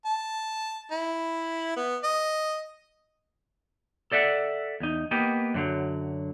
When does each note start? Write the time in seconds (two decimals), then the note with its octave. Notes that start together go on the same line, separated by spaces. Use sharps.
0.06 A5
0.91 E4
1.77 B3
2.04 D#5
4.12 A4 D5 E5 F#5
4.80 E2 D#4
5.11 A#3 B3 G4 D#5
5.54 F#2 D3 F#3